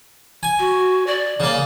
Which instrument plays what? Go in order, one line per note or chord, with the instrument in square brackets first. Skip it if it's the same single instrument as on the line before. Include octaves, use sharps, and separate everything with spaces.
[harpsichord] G#5
[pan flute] F#4
D5
[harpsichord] C#3 A#3